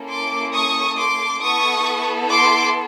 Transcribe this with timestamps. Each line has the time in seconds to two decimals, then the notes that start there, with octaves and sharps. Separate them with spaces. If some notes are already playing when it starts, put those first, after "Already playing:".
Already playing: A#3 C#4 E4 A4
0.09 C6 D6
0.53 C#6 D#6
0.98 C6 D6
1.42 B3 E4 A4 C#6 D#6
2.30 C6 D6